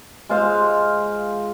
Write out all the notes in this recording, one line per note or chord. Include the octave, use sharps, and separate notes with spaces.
G#3 F4 C5 F5